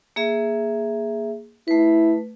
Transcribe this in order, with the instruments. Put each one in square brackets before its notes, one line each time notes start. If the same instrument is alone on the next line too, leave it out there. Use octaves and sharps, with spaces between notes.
[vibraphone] A#3 G#4 E5
[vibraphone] A3 B4 [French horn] E4